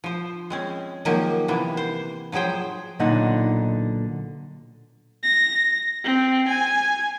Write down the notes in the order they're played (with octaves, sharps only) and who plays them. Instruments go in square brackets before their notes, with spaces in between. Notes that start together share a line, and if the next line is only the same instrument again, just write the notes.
[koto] F3 C5
G#3 C4 C#4
D#3 F3 F#3 G#3 A#3 G4
C3 E3 A#3 B3
C5
F3 F#3 G#4 C5 G5
[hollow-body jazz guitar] B1 A#2 D3 D#4 F#5
[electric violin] A#6
C4
G#5